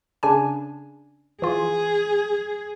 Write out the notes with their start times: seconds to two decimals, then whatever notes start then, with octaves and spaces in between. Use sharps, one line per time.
0.23 C#3 D4 G#5
1.42 E3 F4 G#4